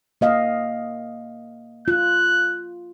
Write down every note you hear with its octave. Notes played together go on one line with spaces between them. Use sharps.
A#3 D#5 F5
F4 F#6